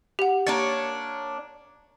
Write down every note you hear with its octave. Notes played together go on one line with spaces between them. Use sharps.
G4 F#5
A#3 D4 C#5 A6